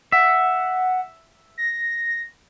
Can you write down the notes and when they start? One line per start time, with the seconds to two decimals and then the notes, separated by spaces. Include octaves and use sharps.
0.12 E5 F#5
1.58 A#6